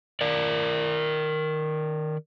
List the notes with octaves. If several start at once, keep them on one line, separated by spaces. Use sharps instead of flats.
D#3 A#4 D5